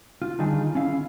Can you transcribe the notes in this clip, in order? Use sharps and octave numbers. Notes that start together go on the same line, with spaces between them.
F4
D3 D#3 G3 D#4 F4 G#4
C#4 E4 F5